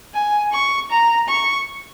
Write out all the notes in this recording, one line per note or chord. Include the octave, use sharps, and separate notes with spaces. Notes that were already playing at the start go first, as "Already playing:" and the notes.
G#5
C#6
A#5
C#6